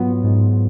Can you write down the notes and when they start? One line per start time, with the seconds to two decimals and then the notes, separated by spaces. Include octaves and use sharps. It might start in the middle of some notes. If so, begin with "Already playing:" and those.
Already playing: G#2 F#3 B3 F4
0.23 G#2